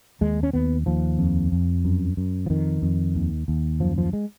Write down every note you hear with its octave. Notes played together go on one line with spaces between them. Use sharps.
D#2 G#3
C#4
D#2 B3
D#2 F3
F2
F2
F#2
F#2
F3
F2 D#3
F2
D#2
D#2
F#2 F3
F3
G#3